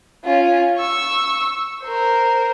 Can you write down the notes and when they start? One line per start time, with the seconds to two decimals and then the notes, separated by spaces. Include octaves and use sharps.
0.25 C#4 F4
0.78 C#6 E6
1.83 A#4 C5